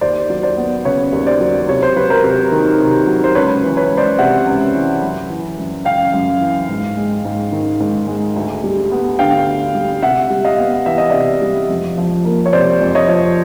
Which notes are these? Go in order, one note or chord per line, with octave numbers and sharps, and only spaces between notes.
D#2 C5 D5
F#3
C5 D5
B3
C#3 B4 C#5
D#2
C5 D5
F#3
C3 C#5
C5
F#3 B4
A#4 C5
C3
D#3
C3
F#3
C5
C#2 B4 C#5
E3
B4 C#5
C#2
C5 D5
C3 E5 F#5
C#2
E3
F#2
E3
F#2
C#3 F5 G5
F#2
E3
G#2
G#3
G#2
D#3
G#2
G#3
D2
G3
B3
D3 F5 G5
D2
G3
C3 E5 F#5
G3
D#5 F5
B3
E3 E5
D#5
C3 D5 E5
G3
F2
F3
A#3
C#5
C3 C5 D5
F2
C#5 D#5
F3